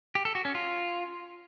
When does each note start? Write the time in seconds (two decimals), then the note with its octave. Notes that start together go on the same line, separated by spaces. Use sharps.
0.15 G4
0.25 A4
0.35 F#4
0.45 C#4
0.55 F4